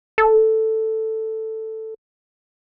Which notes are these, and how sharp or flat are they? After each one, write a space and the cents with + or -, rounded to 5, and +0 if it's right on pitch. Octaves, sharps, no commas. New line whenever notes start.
A4 +5